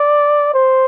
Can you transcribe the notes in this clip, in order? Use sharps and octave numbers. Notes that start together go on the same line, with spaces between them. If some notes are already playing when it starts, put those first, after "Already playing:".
Already playing: D5
C5